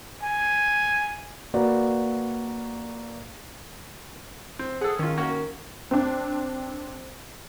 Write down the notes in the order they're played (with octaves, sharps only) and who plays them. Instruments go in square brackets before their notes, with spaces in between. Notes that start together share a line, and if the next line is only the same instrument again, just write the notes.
[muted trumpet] G#5
[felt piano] A#3 F#4 B4 D5
[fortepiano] C4
[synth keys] G#4 [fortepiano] A4 F#5
[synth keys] D#3 [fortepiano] C#4 F4
[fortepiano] A#3 C#4 F#4
[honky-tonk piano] C4 D4